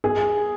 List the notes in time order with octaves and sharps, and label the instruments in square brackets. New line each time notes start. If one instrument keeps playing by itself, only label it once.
[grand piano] G#4